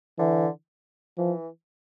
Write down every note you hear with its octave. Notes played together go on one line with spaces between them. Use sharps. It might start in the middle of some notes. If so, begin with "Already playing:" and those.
D3 E3
E3 F3